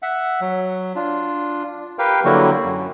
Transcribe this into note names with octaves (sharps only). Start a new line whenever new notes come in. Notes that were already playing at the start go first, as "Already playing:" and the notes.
E5 F#5
F#3
D4 F4
G4 A#4 B4 F5 G5
D3 F#3 G3 A#3 E4 F#4
F#2